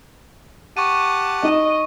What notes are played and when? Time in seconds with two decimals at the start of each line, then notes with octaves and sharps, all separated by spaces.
0.77 G4 F#5 A5 C#6 D#7
1.43 D#4 D#5